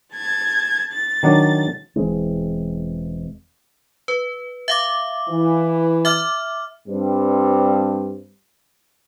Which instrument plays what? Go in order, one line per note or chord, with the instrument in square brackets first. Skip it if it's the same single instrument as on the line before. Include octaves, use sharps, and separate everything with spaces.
[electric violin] A5 G#6
A6
[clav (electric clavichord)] D#3 F#3 D4
[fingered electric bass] E1 E3 G#3 C4
[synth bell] B4
E5 F5 D6
[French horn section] E3
[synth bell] E5 D6 F6
[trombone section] G2 C4